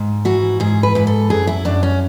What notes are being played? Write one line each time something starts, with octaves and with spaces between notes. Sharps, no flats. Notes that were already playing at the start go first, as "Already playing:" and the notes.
Already playing: G#2
E3 F#4
G#2 G#4
B4
G#2 B4
A4
F#2 G#4
E4
F#2 D4
C#4